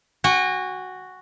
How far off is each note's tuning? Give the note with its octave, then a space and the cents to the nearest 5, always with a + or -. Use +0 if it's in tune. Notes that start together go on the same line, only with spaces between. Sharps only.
F#4 +0 G#5 -45